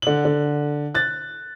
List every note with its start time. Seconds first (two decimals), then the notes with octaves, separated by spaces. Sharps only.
0.02 D3 F#7
0.25 D3
0.95 F#6 A6